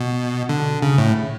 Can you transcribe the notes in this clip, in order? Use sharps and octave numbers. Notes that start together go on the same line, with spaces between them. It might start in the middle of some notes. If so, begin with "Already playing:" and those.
Already playing: B2
D3
C#3
A2